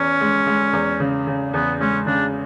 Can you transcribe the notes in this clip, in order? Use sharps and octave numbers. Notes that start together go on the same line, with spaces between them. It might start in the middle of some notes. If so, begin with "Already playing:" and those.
Already playing: E2 C#4
G#3
G#3
E2
C#3
C#3
E2 B3
G#3 C#4
C#3 D4